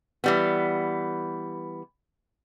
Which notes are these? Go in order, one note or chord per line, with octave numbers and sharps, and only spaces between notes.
E3 G3 B3